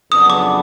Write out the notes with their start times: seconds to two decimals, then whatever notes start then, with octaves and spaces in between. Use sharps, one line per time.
0.11 F2 C#3 F#3 B3 D4 D#6
0.30 D6